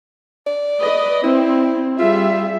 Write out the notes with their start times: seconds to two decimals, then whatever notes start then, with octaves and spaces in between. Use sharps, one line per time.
0.47 D5
0.80 B4 D#5
1.24 C4 E4
1.99 G3 F4 G#4 E5